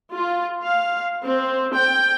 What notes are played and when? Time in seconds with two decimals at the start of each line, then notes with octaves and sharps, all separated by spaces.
0.14 F4
0.63 F5
1.25 C4
1.75 G5